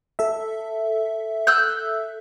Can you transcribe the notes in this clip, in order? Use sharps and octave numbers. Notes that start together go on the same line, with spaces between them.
A4 E5
E6 F#6 G6